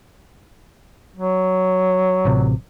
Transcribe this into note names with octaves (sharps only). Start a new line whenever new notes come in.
F#3
A1 C3